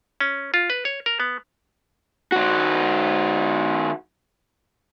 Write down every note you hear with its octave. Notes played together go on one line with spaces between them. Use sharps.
C#4
F4
B4
C#5
A#4
B3
D#3 F#4